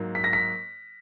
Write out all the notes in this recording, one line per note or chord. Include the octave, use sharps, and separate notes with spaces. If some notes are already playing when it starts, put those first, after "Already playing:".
Already playing: G#2 F#3 A#3
B6
A#6
B6